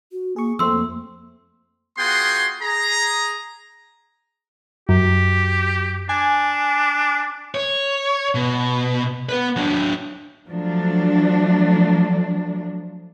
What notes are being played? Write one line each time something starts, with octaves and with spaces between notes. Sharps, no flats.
F#4
A#3 G#4 C#6
F2 A3 A#3 C4 C6 E6
B3 F4 F#4 G#4 G5 C6
G#4 A#5
F#2 G4
D4 G#5
C#5
B2
B3 B4
F#3 D4
F3 F#3 A3 D4